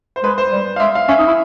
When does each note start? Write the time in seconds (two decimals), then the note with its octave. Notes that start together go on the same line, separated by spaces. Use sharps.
0.16 C5
0.23 G#3 B4
0.38 C5
0.52 G3
0.76 F5
0.80 G#3 E5
0.95 F5
1.08 C#4 E5
1.19 D#4
1.27 E4